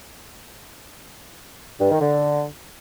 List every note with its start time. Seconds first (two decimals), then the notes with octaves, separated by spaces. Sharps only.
1.80 G2
1.90 D#3
2.00 D3